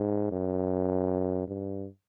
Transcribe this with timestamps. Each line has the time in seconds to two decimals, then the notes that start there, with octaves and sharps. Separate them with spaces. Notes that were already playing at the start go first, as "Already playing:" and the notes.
Already playing: G#2
0.31 F#2
1.47 G2